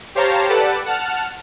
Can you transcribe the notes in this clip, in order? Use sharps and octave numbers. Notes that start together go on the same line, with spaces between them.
G4 C5 C#5 F5 A5 A#5
G4 A4 B4 D5 F#5 A5
F#5 A5 F6